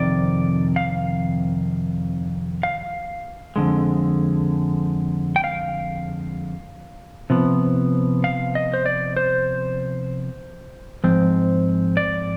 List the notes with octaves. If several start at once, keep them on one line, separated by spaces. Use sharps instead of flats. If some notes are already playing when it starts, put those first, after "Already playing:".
Already playing: F2 C3 D#3 D5
F5
F5
F2 D3 G#3
G5
F5
C3 F3 B3
F5
D#5
C5
D5
C5
G#2 F3 C4
D5